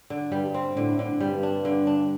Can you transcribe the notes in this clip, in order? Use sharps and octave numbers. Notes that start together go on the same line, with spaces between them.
D3
G2 G3
C4
A2 D3
D3
G2 G3
D4
D3
D4